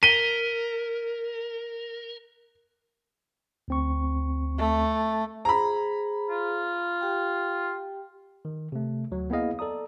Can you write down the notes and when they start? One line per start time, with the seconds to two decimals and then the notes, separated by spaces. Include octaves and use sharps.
0.03 A#4 B6 D#7 G7
3.68 D2 C4 C#6
4.58 A3
5.45 G#4 C5 A#5 B5
6.30 F4
7.01 G4 G5
8.45 D#3
8.72 C3 A3
9.11 D2 F#3
9.30 A#3 B3 E4 G#4 D#5 F5
9.59 A4 D5 A#5 D#6